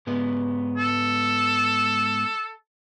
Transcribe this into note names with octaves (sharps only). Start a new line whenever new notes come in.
G#2 G#3 B3
A4